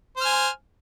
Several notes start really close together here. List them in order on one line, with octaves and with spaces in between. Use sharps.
C5 F6 G#5